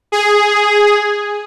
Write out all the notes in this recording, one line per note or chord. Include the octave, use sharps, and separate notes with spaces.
G#4